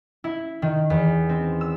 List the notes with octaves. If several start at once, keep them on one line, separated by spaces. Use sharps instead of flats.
E4
D#3
E2
C4
E6